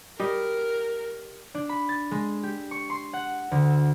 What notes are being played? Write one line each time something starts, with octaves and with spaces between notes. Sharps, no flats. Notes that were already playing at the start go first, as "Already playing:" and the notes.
G3 A#4 D#5
D4
B5
A6
G#3
G4
C#6
C6
F#5
D2
E6